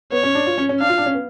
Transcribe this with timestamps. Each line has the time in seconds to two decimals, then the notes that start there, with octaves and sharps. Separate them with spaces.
0.12 B3 C#5
0.23 C#4
0.35 D4
0.47 F4
0.58 C#4
0.69 C#4
0.80 D4 F5
0.89 F4
0.98 D4
1.06 C#4
1.14 B3